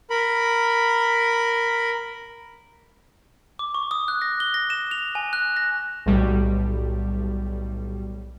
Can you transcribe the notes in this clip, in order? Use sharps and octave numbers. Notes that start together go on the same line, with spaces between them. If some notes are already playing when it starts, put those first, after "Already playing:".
A#4 B5
D6
C#6
D#6
F#6
A#6
G7
A#6
E7
F7
G#5
F#6
A#6
B1 A2 G3